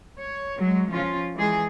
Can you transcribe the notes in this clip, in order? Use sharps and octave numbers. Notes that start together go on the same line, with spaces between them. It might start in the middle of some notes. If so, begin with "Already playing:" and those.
C#5
F#3 G#3
F3 C#4 F4
E3 G#3 G#4